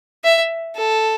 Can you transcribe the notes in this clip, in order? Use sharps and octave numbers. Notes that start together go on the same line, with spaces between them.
E5
A4